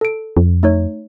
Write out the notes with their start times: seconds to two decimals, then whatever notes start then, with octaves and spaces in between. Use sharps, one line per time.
0.01 A4 D7
0.37 F2
0.63 A3 D#4 C#5